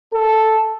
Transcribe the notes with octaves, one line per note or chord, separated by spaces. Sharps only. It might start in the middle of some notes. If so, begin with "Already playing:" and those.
A4